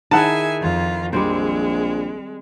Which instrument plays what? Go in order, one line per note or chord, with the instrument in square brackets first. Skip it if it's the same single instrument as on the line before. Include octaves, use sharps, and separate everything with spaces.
[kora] D#3 E4 [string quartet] G#4 E5 G#5 [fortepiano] F#5 A5
[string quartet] F2 F4
[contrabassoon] A#1 [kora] G3 C4 C5 [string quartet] G#3